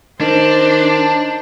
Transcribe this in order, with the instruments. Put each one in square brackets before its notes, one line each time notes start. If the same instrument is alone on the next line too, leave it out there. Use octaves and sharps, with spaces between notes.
[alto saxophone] D#3 [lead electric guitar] D4 [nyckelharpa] C5